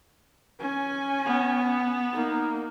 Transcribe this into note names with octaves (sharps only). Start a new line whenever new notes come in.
C#4 G#5
B3
A#3 D#4